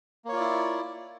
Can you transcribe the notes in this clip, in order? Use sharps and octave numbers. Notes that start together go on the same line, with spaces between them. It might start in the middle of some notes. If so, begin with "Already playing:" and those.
A#3 E4 F4 C#5 D5